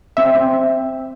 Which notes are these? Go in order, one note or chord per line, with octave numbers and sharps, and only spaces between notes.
C4 E5
C4